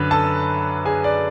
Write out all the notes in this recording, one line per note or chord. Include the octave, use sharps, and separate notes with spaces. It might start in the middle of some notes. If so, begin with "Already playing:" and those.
Already playing: F#2 D3 B4
A4 A5
G#4 G#5
D5